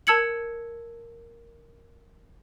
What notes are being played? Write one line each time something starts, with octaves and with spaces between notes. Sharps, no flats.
A#4 A5 E6 G#6 C#7 F#7